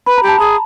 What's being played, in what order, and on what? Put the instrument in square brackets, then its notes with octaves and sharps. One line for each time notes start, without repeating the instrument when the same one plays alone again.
[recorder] B4 [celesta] B5
[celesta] A#5
[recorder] G4
[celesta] A5
[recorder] G#4 [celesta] A#5